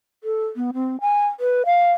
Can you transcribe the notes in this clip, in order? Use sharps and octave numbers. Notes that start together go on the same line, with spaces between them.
A4
B3
C4
G#5
B4
F5